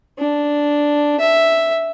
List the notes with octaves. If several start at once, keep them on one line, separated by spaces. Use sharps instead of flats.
D4
E5